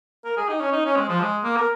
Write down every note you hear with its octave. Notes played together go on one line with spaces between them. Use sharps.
A#4
G#4
D#4
C#4
D#4
C#4
G#3
F3
G#3
A#3
A#4